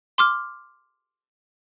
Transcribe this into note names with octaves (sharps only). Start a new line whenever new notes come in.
C6 D6 F6